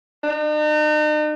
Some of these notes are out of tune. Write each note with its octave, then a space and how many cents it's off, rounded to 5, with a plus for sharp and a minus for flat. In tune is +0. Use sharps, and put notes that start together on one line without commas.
D#4 -45